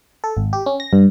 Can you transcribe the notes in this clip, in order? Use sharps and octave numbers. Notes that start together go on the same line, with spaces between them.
A4
G#1
G4
C#4
A#6
G2